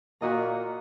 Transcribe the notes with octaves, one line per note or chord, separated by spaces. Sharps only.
A#2 A#3 F#4 D#5 A#5